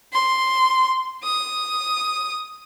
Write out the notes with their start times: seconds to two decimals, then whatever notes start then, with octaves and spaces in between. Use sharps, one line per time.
0.13 C6
1.24 D#6